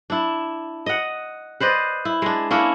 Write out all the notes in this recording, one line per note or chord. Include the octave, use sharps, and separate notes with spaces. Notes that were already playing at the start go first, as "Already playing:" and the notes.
D4 E4
D#5 F#5
B4 C5 D5 D#5
E4
G#3 D4
A#3 C#4 D4 E4